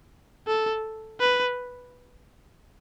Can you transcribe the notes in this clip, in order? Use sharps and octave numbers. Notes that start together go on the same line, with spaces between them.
A4
B4